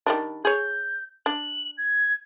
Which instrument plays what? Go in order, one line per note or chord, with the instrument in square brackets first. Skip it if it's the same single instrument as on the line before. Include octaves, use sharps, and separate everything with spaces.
[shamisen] D#3 G3 D4
[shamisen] G#4 C#5 [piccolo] G6
[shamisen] D4 [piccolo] F#7
[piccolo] G#6